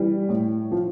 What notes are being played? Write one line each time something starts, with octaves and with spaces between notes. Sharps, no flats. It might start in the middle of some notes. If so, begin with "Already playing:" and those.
Already playing: E3 G3
A2
F3